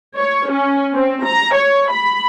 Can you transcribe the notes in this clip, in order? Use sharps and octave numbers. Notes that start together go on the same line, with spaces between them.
C#5
C#4
C4
A#5
C#5
B5